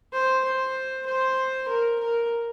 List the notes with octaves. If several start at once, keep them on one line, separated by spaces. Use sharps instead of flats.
C5
C5
C5
A#4
A#4